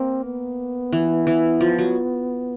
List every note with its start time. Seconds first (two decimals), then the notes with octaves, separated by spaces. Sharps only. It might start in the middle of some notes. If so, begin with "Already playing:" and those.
Already playing: A#3 C4
0.24 B3
0.92 E3
1.27 E3
1.61 F3
1.79 F#3